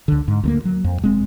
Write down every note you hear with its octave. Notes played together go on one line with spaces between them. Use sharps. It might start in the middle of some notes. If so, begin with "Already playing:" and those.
C#2 D3
G#2
D2 A3 A#3
F#3
F2
E1 G#3 C4